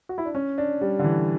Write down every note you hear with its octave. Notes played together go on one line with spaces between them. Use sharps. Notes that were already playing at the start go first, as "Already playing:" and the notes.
F#4
E4
D4
C#4
D4
G3
D3
E3